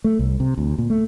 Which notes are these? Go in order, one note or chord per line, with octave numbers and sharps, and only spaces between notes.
A3
C2
C3
D2
A#2
A3